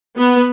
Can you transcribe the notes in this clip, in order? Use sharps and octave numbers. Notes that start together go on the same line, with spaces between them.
B3